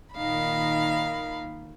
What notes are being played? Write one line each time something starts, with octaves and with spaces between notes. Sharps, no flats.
A#2 D#3 F5 B5